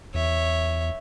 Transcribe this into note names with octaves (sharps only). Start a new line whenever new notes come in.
E2 C#5 E5